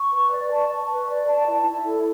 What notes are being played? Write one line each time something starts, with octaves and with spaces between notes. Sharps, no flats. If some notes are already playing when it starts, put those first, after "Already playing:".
Already playing: C#6
B4
D5
A5
C#6
B4
D5
A5
E4
E4
A4